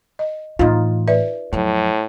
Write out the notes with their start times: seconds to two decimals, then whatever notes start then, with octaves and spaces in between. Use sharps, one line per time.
0.19 D#5
0.59 A2 E3 D#4 F4
1.08 B4 D5 E5
1.53 F2 A2 F#3